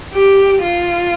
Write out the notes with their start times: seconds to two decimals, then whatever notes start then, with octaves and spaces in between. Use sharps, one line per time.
0.13 G4
0.63 F4